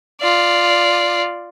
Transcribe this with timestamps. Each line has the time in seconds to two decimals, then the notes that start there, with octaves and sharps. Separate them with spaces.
0.21 F4 D5